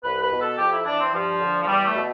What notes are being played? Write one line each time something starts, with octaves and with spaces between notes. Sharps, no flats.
C2 B4
B4
B2
A4
F2 G4
E4
E3 D4
C4
G2 F3
D3
F3
E2 G3
A3
B2